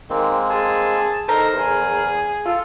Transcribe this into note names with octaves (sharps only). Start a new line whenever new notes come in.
D#3 G#3 A#3 C4
G#4 A5
D#4 A4 A#4 C5 A#5
E2 G#4
F4 A4